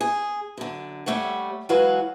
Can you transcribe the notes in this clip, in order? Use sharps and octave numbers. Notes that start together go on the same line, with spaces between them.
G#4
F#2 D3
G3 A3 C#5 F#5
E3 F#3 G#3 F#4 B4 F5